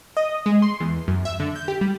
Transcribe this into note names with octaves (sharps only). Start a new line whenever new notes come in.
D#5
G#3
C6
E2
F#2
E5
D3
G6
G4
G3